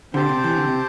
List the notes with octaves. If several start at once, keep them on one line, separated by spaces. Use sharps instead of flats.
D3 C4 G4 C5 A5
C3
E3
D3
C3